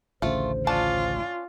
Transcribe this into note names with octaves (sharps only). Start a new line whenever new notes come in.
A1 D2 C#3 A3 F4 C5
C#4 D4 F4 A5